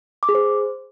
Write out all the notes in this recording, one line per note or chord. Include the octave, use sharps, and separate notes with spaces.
D6
G#4
C5